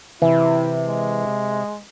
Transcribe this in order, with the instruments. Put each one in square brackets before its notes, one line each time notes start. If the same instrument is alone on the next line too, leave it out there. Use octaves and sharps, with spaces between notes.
[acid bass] C3 [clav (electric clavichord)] E3 [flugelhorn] E4
[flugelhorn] G#3